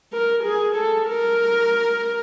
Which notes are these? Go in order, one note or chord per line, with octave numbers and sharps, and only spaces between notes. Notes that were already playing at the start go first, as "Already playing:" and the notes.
A#4
G#4
A4
A#4